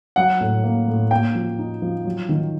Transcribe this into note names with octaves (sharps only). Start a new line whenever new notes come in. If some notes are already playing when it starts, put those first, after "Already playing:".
F#3 F#5
A2
A#3
A2
A#3 G5
F3
D#4
F3
F#3
D#3